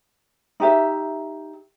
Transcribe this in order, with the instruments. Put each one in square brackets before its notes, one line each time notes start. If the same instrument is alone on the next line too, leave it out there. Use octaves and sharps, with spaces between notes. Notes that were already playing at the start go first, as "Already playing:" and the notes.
[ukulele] D#4 G4 E5